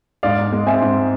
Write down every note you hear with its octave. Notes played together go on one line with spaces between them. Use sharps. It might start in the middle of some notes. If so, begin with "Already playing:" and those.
G#2 D5 F5
G#2
G#3
C4 E5 G#5
G#2